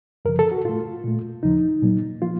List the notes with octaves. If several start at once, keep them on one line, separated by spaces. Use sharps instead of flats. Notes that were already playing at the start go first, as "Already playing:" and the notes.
F#2 C#3 F3 A#4
A4
F#4
A2 A3 F4
A#2 A3
D#2 C#3 F3 D#4
A#2 F#3 A#3
F3 A#3 F4